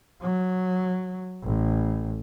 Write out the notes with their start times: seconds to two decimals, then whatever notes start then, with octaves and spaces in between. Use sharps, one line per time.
0.21 F#3
1.43 A1